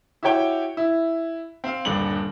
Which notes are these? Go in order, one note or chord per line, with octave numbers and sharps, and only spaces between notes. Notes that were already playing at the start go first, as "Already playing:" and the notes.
E4 F#4 G4 C#5 G5
E4
C4 F5
D#1 G2 D3 G3 F#7